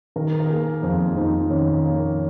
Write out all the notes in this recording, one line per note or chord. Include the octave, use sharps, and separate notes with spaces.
D#3 A#4
A#4
A#3 G#4
F2 F4
F2 D#4
D#3 C#4
A#3